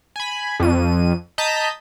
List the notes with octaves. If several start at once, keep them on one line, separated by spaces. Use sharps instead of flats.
G#5 B5
F2 D#7
D#5 A5 A#5 G6 B6 D#7